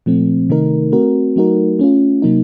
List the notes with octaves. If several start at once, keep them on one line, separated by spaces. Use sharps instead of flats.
A#2 F3 A3 C4
C3 D#3 A3 D#4 A#4
A3 C4 F#4 A#4
F#3 A3 D#4 F#4 A#4
A3 C#4 F4
C3 F#3 A#3 D#4